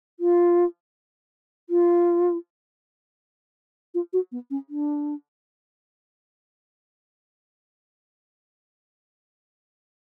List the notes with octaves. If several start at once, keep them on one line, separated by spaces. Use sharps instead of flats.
F4
F4
F4
F#4
B3
C#4
D4